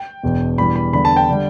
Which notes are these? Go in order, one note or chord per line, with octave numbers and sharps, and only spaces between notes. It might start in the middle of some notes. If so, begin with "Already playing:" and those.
Already playing: G5
E1 E2 B2
E1 E2 E3 G3 B5
B5
E2 D3 G3 B5
A5
G5
D3 G3